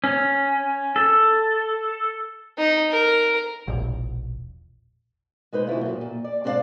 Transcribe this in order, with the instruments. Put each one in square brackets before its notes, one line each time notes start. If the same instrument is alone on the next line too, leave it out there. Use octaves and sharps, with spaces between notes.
[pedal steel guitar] C#4
A4
[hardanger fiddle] D#4
A#4
[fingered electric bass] E1 A#1
[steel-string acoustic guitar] G#3 D#4 B4 C5
D2 B2 E4 F4
F#2 A#2
A#2
D5
G#2 C4 D4 G4 D5 F5